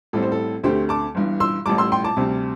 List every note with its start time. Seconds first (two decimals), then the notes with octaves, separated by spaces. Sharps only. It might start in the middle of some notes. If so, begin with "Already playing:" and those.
0.13 A1 A2 G3 C4 A4
0.23 C5
0.32 A4
0.63 D2 D3 A3 C4 G4 C5
0.89 A5 D6
1.15 G1 G2 E3
1.40 C6 E6
1.66 A1 A2 G3 A5 D6
1.78 C6 E6
1.92 G5 C6
2.04 A5 D6
2.17 D2 C3 G3 C4